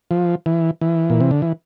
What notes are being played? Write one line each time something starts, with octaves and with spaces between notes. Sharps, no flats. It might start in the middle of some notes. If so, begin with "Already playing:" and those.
F3
E3
E3
A#2
C3
D3
E3